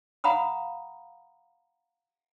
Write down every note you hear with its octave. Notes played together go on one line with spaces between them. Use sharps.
F5 F#5 A#5 B5 D#6